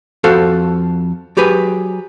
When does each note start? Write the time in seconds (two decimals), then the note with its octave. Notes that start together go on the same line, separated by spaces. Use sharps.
0.24 F2 F#4 A4 C5 F5
1.37 F#3 G4 G#4 B4